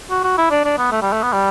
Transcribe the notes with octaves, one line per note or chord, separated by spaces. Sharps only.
F#4
F#4
E4
D4
D4
B3
A3
G3
A3
B3
G3